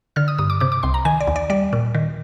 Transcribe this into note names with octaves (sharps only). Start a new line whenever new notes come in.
D3 F6
D#6
G2 D#6
D6
C3 D6
D6
C2 C6
A#5
D#3 G#5
D5
D#2
D5
G3 D5
A#2
D#3